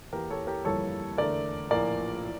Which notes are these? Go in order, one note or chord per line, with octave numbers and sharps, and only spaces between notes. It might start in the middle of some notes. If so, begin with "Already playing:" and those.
E2 E3 A#3 G4 A#4
A4 C#5
G4 A#4
G1 F2 E3 G3 A#3 A4 C#5
E2 D3 A3 A#4 D5
A#1 A2 F3 A#3 A#4 D5
E3